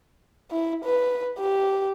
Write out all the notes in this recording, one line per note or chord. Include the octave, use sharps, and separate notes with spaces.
E4
B4
G4